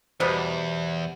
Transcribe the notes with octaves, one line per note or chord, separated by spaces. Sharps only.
E2 B2 G3 B3 C5